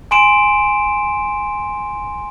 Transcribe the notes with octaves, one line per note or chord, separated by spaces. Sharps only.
G#5 C6 D7 E7